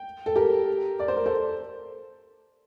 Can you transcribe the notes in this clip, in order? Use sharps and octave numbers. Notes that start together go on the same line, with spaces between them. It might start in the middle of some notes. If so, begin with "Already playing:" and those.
Already playing: G5
A4
G4 A#4
D5
C5
A#4
A4 C5